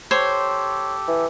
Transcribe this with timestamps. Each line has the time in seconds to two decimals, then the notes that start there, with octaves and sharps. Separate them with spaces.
0.11 G4 A4 C5 C#5
1.08 E3